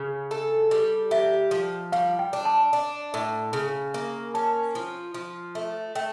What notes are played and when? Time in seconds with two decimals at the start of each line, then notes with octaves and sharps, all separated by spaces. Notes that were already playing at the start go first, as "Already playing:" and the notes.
Already playing: C#3
0.31 A4
0.71 G3
1.11 G4 E5
1.51 F3
1.92 G3 F5
2.19 G5
2.33 D4
2.45 A5
2.73 D4
3.14 A2
3.53 C#3
3.94 A#3
4.34 C#4 A5
4.75 F3
5.14 F3
5.55 A3
5.95 A3 G5